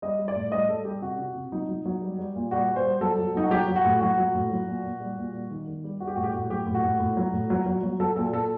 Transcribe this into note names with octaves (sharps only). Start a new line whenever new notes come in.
G3 D#5
G3
D5
A2
G3 D#5
G3 A4
G3 G4
C3 F#4
C3
C3
F#3 D#4
F#3
F#3
G3
G3
A#2
G3 F#4
G3
C5
G3
F#3 A4
F#3
F#3 D#4
F#4
F#3 G4
F#3
F#4
A2
F#3 F#4
F#3
A2
F#3
A#2
A#2
G3
A#2
G3
D#3
D#3
G3
G3 F#4
G4
A2 F#4
G4
A2 F#4
F#3 G4
A2
F#4
A2
A2
F#3
A2
F#3
F#3
F#3
F#3 A4
A#2 A4
A#2 A4